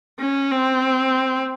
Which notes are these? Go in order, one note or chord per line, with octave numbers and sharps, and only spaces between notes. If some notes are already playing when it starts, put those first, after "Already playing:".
C#4
C4